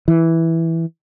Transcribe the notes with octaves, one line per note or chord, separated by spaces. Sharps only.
E3